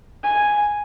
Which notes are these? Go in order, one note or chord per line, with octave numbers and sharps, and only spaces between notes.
G#5